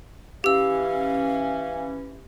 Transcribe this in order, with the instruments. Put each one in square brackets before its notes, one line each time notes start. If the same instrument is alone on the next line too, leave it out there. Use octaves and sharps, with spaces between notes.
[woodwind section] E3 C#4 [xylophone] G4 E6 [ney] F5